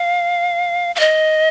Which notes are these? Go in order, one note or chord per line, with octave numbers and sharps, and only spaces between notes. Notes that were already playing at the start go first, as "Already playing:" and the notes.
Already playing: F5
F5
D#5